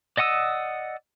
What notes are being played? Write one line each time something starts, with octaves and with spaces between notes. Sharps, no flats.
D5 D#5 F#5 D#6 E6